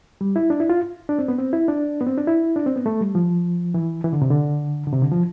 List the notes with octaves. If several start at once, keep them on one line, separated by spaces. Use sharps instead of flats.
G3
E4
D4
E4
F4
D4
C4
B3
C4
E4
D4
B3
C4
D4
E4
D4
C4
B3
A3
G3
F3
E3
E3
D3
C3
D3
D3
C3
D3
F3